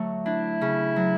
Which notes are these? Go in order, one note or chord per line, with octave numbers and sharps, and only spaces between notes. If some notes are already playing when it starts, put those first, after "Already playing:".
Already playing: D3 F#3 A3
D4 E4
C#3
F#3